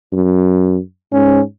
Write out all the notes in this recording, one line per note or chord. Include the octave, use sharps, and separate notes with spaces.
F#2
G#2 C#4